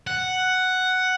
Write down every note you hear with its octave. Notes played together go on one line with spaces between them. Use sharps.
F#5